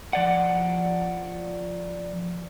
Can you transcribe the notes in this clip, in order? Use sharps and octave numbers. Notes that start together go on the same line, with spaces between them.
F3 D5 F#5